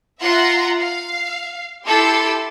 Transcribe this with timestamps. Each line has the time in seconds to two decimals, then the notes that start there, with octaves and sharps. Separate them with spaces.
0.22 F4 E5 F#5 A#5 C6
0.79 F5
1.86 E4 G4 A4 C6